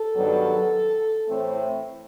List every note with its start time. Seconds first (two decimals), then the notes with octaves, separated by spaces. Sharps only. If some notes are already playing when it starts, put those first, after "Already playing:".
Already playing: A4
0.15 G2 D#3 F#3 B3
1.28 A2 E3 A3 C4